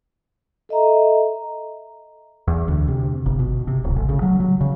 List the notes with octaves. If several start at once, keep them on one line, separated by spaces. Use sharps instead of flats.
A4 D#5 E5 A#5
E2
D2
C3
G1
B2
C3
D1
A1
C#3
F#3
F#3
C#3